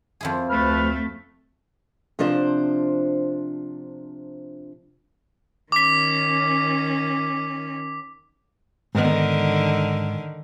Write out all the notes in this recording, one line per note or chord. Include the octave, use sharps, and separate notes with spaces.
F2 E4 G#4
D2 F3 A3 B4 F6
C3 F3 D4 C5
D#3 C#4 D6 B6
G#2 D3 D#3 B3